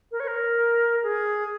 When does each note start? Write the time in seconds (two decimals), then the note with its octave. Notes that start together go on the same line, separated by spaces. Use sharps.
0.11 A#4
0.20 C#5
0.27 A#4
1.03 G#4